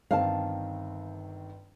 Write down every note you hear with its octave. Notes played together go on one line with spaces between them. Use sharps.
G1 D#3 C4 F5 A5